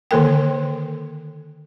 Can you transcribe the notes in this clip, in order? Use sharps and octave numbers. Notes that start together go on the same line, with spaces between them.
D3 D#3 A#3 A4 A#4 G5